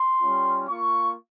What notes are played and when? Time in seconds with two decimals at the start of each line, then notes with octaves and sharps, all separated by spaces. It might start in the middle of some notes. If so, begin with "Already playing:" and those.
Already playing: C6
0.21 G3 C#4 F4
0.68 A#3 F4 C#6